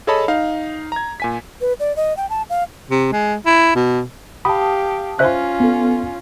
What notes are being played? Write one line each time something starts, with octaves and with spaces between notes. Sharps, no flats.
G#4 A4 C#5 D#5 A5 B5
D#4 F5
A#5 G#6
A#2 G#5 B6
B4
D5
D#5
G5
A5
F5
C3
G#3
E4
B2
G4 F5 A5 B5 D#6
C#4 F4 C5 E5 F#6
B3 A4